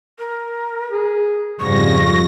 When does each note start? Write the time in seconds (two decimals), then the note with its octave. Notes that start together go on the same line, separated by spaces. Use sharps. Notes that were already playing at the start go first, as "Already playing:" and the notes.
0.19 A#4
0.91 G#4
1.60 F2 G#2 C#3 G3 C#6 A#6